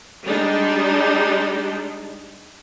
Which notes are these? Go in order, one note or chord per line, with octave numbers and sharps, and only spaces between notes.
G3 G#3 D4 D#4